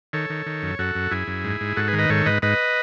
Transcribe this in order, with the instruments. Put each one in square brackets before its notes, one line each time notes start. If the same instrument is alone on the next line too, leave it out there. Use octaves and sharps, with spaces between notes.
[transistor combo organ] D#3 A4 C#5
D#3
D#3
F#2
F#2 F#4 A4
F#2
F#2 E4 G#4
F#2
G#2
G#2
G#2 F#4 A4
G#4 B4
D#3
B4 D#5
G#2 A4 C#5
G#2 B4 D#5
G#2 B4 D#5